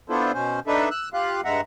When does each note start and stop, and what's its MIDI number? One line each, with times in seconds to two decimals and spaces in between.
0.09 0.32 59
0.09 0.32 62
0.09 0.32 64
0.09 0.32 65
0.09 0.32 69
0.09 0.32 72
0.33 0.60 47
0.33 0.60 61
0.33 0.60 72
0.67 0.89 62
0.67 0.89 63
0.67 0.89 69
0.67 0.89 71
0.67 0.89 76
0.91 1.09 88
0.91 1.09 90
1.14 1.41 65
1.14 1.41 67
1.14 1.41 77
1.14 1.41 90
1.45 1.61 43
1.45 1.61 56
1.45 1.61 76
1.45 1.61 78
1.45 1.61 82